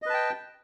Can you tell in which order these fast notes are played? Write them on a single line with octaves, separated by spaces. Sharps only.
D#5 B4 A5 G5